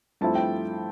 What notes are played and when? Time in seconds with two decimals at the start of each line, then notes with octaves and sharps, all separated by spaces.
0.21 G2 F3 A3 C4 E4 A5
0.35 G5